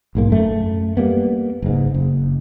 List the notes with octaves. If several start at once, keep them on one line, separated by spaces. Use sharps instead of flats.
B1 G#2 A#3
F#2 A3
G3 A#3 B3
F#1 G#2
F#1